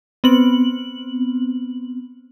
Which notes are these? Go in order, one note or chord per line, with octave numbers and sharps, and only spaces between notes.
B3 C4 F#7